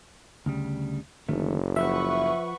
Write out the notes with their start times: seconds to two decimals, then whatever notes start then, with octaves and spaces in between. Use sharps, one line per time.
0.46 D2 C#3 G3
1.29 F#1 D3 D#3 A3
1.76 F3 B4 E5 F#5 C#6